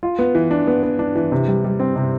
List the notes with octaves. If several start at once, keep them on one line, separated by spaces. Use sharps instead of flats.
F4
B3
E3
D4
B3
B3
D4
E3
C3
G3
G3
C4
C3